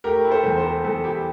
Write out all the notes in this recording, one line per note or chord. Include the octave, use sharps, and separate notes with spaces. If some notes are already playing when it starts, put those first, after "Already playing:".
A3 G4 A#4
E4
A4 C5
E2
A4 C5
E4
E2 A4
E4 G4